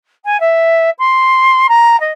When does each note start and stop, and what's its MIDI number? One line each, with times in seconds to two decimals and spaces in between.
0.25 0.39 80
0.40 0.90 76
0.99 1.67 84
1.69 1.99 82
2.00 2.11 75